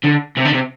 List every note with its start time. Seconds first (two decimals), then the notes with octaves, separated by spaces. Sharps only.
0.04 D3
0.37 C3
0.45 D3
0.54 C3